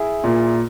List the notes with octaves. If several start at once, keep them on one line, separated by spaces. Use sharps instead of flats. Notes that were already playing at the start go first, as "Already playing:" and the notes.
Already playing: E4 G#4
A#2